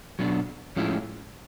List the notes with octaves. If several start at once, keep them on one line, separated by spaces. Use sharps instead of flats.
B2 F#3 B3 D4
A2 F3 G#3 C#4 E4